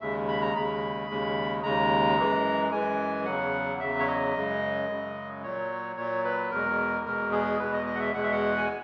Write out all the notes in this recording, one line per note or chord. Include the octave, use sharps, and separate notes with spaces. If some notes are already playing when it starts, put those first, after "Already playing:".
D#2 C#3 G#3 E5
B5
A#5
D#2 C#3 G#3 B5
D#2 C#3 G#3
D#2 C#3 G#3 A#5
F#2 E3 G#3
F#2 E3 G#3 G#5
E2 C#3 F#3 F#5
E2 C#3 F#3 E5
C#5
D#5
F#2 C#3 G#3
F#2 C#3 G#3
A#2 F#3 C#5
A#2 F#3 C#5
B4
E2 B2 G#3 A#4
E2 B2 G#3 A#4
G#4
E2 B2 G#3 B4
D#5
D#5
F#5
E5
E2 B2 G#3 F#5
E5
F#5
G#5